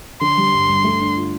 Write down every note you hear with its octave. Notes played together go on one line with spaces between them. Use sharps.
D3 C6
G3
G2
G2
A3
D4
F4